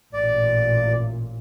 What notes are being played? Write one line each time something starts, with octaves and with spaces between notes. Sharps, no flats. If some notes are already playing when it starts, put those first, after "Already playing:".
A1 A#2 D5